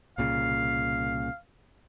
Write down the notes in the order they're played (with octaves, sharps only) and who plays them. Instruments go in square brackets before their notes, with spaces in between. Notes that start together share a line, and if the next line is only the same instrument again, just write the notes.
[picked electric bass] C2 A#2 C#3 [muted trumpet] F5